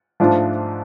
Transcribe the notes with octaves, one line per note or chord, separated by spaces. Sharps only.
G#2 F3 A3 D4 F4